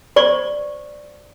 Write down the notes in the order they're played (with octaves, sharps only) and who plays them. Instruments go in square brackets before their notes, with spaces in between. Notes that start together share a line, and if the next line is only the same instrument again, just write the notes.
[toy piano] C5 D5 C#6